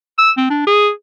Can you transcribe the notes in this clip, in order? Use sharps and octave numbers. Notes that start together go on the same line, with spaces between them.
E6
C4
D4
G#4